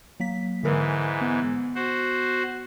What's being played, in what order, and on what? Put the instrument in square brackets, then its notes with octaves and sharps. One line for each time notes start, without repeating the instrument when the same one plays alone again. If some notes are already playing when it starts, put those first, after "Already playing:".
[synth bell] F#3 A#3 B6
[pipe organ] G#2 E3 [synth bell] D3 A#4 B4
[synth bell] B3
[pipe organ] F#4 C5